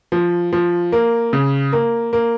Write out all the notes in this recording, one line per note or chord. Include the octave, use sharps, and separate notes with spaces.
F3
F3
A#3
C#3
A#3
A#3